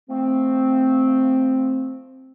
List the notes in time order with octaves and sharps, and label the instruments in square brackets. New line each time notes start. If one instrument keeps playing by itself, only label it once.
[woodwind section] F3 A3 C4